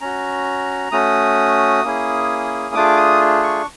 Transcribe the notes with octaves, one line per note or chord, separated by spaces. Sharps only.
C#4 F#4 A#5
A3 C#4 F#4 D#6
A#3 C#4 E4 G#4
A3 D4 F4 G#4 D6
D#6
C#6